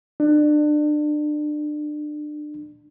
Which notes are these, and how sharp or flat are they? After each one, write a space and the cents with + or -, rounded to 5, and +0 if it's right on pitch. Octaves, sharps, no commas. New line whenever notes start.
D4 +30